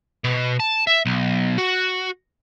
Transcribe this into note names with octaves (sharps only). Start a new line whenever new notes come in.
B2
A5
E5
B1
F#4